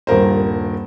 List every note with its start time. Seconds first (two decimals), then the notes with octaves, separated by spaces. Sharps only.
0.07 D#1 G2 A#4 C5